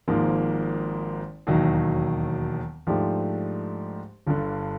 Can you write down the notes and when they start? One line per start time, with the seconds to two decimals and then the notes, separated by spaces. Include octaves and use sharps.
0.08 G#1 G#2 F3 A#3
1.47 E1 D#2 D#3 F#3
2.87 G#2 F3 A3 D4 G4
4.27 G1 G2 D3